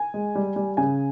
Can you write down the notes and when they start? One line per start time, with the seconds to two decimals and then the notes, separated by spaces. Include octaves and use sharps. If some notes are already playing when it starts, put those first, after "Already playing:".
Already playing: G#5
0.14 G#3
0.35 G3
0.56 G3
0.77 C#3 G#5